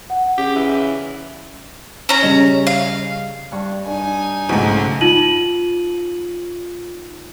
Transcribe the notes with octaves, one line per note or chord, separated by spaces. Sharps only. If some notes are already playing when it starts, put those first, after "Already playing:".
F#5
C#3 G4
E3
C#4 A#5
C#3 G3 D#5
F5
G2 G3 C#6
D4 D#4 G#5
B1 G#2 C#3 G#3 A3 F#4
D#4 F4 D#7 F#7